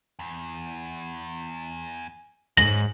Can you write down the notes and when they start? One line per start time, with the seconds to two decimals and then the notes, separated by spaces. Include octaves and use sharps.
0.19 E2
2.57 G#2 F#3 C#4 A#6 F#7